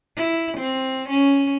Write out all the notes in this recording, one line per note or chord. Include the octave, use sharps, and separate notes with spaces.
E4
C4
C#4